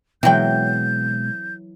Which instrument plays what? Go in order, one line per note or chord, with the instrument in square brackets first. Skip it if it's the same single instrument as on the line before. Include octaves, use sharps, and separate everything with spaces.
[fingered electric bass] B2 G#3 [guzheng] E3 F#3 [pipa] C4 G5 [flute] G6